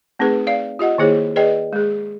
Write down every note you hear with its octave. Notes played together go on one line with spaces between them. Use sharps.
A3 C4 D#4 G#4 B4
D5 F5
F4 G4 D#5 F#5
D#3 A#3 E4 G#4 C#5
G#4 B4 D5 D#5 G5
G#3 G#4